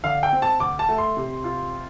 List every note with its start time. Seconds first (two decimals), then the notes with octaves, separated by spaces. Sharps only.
0.04 D3 F5
0.23 G5
0.32 C4
0.42 A5
0.60 D2 D6
0.79 A5
0.89 A3
0.98 C6
1.17 C3
1.44 F4